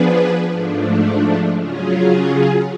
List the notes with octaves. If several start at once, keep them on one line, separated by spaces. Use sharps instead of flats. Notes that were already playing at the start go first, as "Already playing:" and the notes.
Already playing: F3 B3 D4 G#4 B4
G#2 F3 A3 D4
C#3 F#3 C#4 F4 G#4